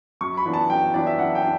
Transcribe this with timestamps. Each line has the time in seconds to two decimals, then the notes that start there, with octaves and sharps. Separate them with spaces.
0.21 F#2 C#6
0.37 B5
0.45 E3 B3 D4
0.54 A5
0.70 F#2 G5
0.94 E3 B3 D4 D5
1.07 E5
1.18 F#2 F#5
1.35 G5
1.43 D4